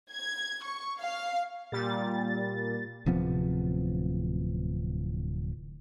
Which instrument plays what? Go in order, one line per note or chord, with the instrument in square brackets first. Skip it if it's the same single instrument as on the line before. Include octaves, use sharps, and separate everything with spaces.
[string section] G#6
C#6
F5
[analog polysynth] A#2 G3 A6
[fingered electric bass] D1 C3 F3 B3